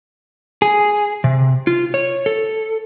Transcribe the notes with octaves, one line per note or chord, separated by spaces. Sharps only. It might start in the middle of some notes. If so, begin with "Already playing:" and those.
G#4
C3
F4
C#5
A4